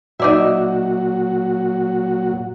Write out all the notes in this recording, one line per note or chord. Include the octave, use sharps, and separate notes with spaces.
A#2 F#3 D#4 F#4 D5 E5